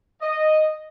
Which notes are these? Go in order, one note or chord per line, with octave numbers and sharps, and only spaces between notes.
D#5